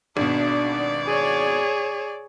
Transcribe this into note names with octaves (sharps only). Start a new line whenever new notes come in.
G#1 B2 D4 D5
G#4 C#5